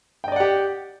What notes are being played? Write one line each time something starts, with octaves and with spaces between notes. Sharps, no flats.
G4 D5 D#5 F#5 G5